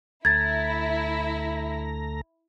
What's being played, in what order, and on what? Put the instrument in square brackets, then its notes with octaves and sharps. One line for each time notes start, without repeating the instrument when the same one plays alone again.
[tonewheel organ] D2 A3 A#5 [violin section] E4 [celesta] G#6 A6